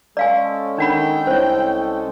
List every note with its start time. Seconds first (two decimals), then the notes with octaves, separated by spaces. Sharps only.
0.17 G#3 C#4 A4 D5 F5 G#5
0.78 D#3 D4 F#5 G5 B5
1.27 C2 C5 C#5